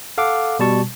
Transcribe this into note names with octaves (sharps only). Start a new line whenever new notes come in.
A4 F5 F#5 D6
B2 G3 A5 C#6